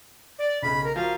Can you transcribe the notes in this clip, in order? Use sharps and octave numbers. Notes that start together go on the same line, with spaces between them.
D5
B1 C#3 B5
A#4
F3 F#4 A#4 F5